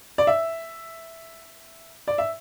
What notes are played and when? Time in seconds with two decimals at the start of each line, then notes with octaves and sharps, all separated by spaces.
0.18 D5
0.27 E5
2.08 D5
2.18 E5